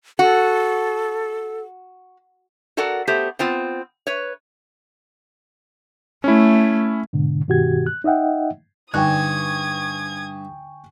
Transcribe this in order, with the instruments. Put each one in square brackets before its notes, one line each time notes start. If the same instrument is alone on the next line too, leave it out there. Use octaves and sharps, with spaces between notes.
[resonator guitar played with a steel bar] F#4 [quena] A4
[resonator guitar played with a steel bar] F#4 A4 A#4 D5 F#5
A3 B3 G4 C5
B3 C4 F4
B4 C#5
[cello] A3 [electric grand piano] C#4 E4
[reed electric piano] G#2 B2 D3
G2 B2 D#3 F#4 G4 G#6
F#6
D#4 D#5 E5 F#5 G5
[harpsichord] G2 [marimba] D3 D#4 [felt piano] G5 G#5 C#6 [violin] D#6 G#6